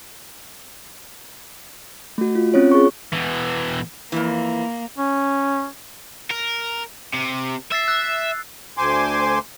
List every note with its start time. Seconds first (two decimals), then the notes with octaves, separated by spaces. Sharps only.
2.18 A3 F#4
2.35 F4
2.54 C4 C#4 F4 C#5
2.72 G#4 C#6
3.12 B2 E3
4.12 F2 E3 A#3
4.97 C#4
6.31 A#4
7.14 C3
7.72 E5 E6 A6 C7
7.88 E6 F#6
8.77 D2 C5 G#5 C6 D6